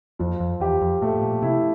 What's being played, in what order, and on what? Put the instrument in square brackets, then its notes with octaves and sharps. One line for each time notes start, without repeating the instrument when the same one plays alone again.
[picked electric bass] F2 [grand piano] F3
[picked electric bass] F2
[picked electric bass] E2 [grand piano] G4
[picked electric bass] F2
[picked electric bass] A2 [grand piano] A3
[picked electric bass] A#2
[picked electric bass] C3 [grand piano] E4